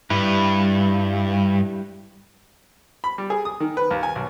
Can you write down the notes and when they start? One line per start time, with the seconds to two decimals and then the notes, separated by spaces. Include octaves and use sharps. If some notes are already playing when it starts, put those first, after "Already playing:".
0.10 G2 G3 E4 B4
3.04 B5
3.18 G3
3.30 G#4
3.45 D#6
3.60 D#3
3.77 B4
3.91 D#2
4.03 G#5
4.16 B1